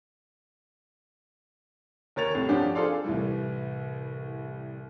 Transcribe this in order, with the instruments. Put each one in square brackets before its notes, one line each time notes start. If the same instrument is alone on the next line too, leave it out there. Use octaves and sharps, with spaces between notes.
[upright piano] D#2 A#4 C#5 A6 F7
C2 A2
G2 F3 C#4 D4 F#4 G4
F4 G#4 A4 C5 D5 F5
[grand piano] C2 A2 E3 G3